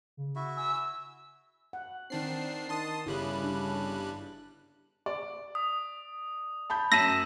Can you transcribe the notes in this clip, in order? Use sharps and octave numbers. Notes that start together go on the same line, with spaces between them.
C#3
E4 F#4 E5
G#5 E6
F#5
D#3 C4 D4 C7
D#3 A5 C6 D#6
G1 C#3 G3 E4 F#6
D4
D5
D#6
A5 B5 G6
F#2 A5 E6 A#6 B6 D#7 E7